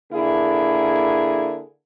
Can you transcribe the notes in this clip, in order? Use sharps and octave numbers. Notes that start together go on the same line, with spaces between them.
D3 A#3 E4 G#4